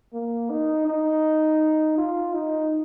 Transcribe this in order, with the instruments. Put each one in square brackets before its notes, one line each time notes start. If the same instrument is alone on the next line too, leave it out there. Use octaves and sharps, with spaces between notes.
[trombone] A#3
D#4
D#4
F4
D#4